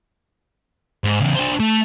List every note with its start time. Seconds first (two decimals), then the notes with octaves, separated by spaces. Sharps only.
1.04 G#2
1.20 E2 C#3
1.35 D4 C5
1.60 A3